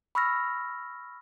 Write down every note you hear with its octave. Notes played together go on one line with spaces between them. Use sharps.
B5 C#6 E6 F6 A#6